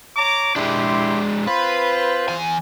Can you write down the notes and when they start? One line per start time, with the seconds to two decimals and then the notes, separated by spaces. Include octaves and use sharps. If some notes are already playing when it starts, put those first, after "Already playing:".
0.17 C#5 A#5 D6
0.56 G#3 D4 E4 G4 C6
1.47 C4 F4 B4 C5
2.29 E2 G#5